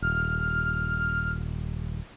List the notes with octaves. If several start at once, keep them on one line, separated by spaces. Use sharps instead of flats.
D#1 F6